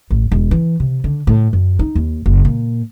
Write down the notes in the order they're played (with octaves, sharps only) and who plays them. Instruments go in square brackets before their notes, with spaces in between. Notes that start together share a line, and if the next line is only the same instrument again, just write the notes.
[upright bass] A1
E1
E3
C3
D3
A2
F#2
D#4
D#2
F#1
A#2